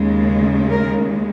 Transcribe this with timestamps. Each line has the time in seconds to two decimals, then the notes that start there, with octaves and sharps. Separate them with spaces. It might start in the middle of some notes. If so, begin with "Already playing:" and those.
Already playing: D#2 C#3 G#3
0.70 A#4